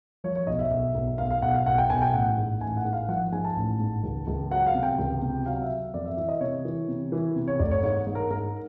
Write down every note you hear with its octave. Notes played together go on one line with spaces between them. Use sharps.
F3 C#5
C#5
B1 D#5
E5
B1
B1
B1 F5
F5
B1 F#5
F5
B1 F#5
G5
B1 G#5
G5
A1 F#5
G#2
A1 G#5
F#5
G#2
F5
F3 F#5
G#2 G#5
A5
A1
G#2
C#2
C#2
F#3 F#5
F5
C3
G5
C#2
C3
F#3 F5
E5
F#3
F2 D5
E5
E3 E5
D#5
C3 C#5
E3
C3
E3
C3
C#5
F1 D5
C#5
G#2 C#5
G#2
A#4
G#2 A#4